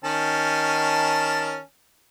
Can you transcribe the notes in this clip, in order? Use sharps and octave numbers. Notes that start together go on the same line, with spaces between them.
D#3 C#4 A5